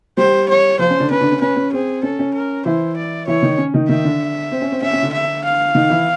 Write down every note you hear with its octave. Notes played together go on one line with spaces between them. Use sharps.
G3 G4 C5
C#5
F3 F4 C5
C#4
D3 D4
C#4 B4
D3 D4
C#4
C#4 B4
C#4
C4 G#4
C#4 A4
C#4
A#4
E3 E4 C5
D5
E3 E4 C#5
D#3 D#4
C#4
D#3 D#4
D#3 D#4 E5
D3 D4
C4
C#4
C4
C#4 E5
C#4
D3 D4
E5
F5
D#3 D#4
E3 E4